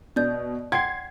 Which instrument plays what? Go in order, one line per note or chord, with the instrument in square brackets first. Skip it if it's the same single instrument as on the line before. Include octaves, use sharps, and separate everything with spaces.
[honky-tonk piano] B2 [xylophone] D5 G6
[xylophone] F#5 G5 C6 [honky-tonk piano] G#6 C7